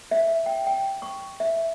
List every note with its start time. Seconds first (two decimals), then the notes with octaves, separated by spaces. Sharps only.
0.11 E5
0.46 G5
0.67 G5
1.02 C#6
1.40 E5